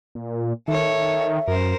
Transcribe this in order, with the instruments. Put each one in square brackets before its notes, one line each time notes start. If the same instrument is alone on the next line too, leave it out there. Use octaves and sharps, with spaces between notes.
[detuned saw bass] A#2
[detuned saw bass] D#3 [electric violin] A4 C#5 [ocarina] E5
[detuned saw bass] F#2 [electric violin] A#4 C5